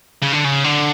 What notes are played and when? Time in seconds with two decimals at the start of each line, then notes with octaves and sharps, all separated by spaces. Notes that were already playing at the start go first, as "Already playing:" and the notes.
0.22 C#3
0.32 D3
0.44 C#3
0.64 D3